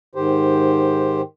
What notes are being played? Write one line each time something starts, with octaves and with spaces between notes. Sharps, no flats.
G#2 D#3 G4 C5